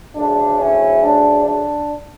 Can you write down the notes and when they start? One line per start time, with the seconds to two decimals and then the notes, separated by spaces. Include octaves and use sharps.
0.15 D2 C#3 F#3 A3 D4
0.59 C#4 E4
1.03 D4
1.46 D4